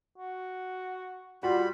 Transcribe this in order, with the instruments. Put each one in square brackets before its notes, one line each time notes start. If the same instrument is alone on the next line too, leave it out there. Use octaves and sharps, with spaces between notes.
[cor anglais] F#4
[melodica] G3 B5 [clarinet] F4 [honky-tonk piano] F#4